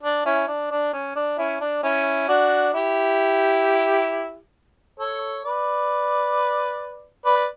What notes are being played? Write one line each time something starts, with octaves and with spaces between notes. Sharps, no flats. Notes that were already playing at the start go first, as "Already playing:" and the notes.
D4
C#4 E4
D4
D4
C#4
D4
C#4 E4
D4
C#4 E4
D4 F#4
E4 G4
A4 C#5
B4 D5
B4 D5